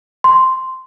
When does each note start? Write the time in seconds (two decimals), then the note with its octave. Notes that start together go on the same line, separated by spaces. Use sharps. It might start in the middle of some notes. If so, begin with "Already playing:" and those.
0.24 C6